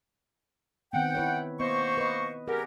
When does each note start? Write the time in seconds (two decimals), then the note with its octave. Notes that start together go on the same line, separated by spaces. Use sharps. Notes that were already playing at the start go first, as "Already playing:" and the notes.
0.93 D#3 B3 C4 F#5 G5
1.15 E4 B4 C#5
1.60 A#3 B3 C5 D#5 C#6
1.98 B4 D#5
2.48 C#4 G4 G#4 A#4 F#5